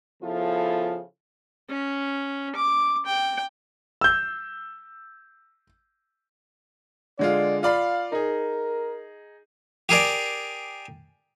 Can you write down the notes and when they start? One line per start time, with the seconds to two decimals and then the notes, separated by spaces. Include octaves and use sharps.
0.22 C#3 F3 B3 E4 F4 A4
1.69 C#4
2.56 D6
3.06 G5
4.01 E6 G6
7.19 D3 G#3 F4 D5
7.63 F4 D5 F5 B5
8.12 D#4 G#4 A#4
9.89 G4 G#4 A#4 D5